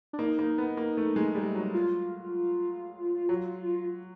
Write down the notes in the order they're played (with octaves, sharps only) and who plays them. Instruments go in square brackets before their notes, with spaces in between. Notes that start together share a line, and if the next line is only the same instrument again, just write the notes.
[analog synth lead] D4
[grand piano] A#3 [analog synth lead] D#4
[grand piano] A#3
B3
A#3
A3
G#3
G3
F#3
[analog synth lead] F4
[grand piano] F#3